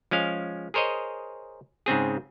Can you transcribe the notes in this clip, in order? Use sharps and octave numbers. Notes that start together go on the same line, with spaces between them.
F3 G#3 C#4 F5
G#4 A#4 C5 C#5 D#5
G#2 C#3 C4 G#4